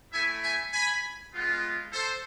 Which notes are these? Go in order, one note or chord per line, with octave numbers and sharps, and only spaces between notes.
A3 E4 E5 G#5
E5 G#5
G#5 B5
G#3 B3 F4
A4 C5